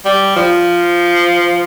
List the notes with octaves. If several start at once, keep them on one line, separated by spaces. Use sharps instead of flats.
G3
F3